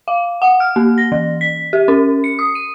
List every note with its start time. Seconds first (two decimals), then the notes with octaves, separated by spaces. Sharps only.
0.08 F5
0.42 F#5
0.60 F6
0.76 A#3
0.98 A#6
1.12 E3
1.41 B6
1.73 G4
1.88 C#4
2.24 C#7
2.39 D#6
2.55 D#7